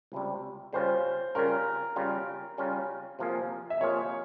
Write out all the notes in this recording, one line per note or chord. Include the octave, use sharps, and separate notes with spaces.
C#2 C3 G3
C#3 G3 C#4 F4 C5
C#3 G3 C#4 F4 A#4
C#3 G3 C#4 F4
C#3 G3 C#4 F4
C3 F3 A#3 F4 G#4
E5
C3 F3 A#3 F4 G#4 C#5